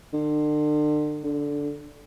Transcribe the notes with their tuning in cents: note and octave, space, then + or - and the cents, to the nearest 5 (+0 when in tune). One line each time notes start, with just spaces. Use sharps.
D3 +35
D3 -10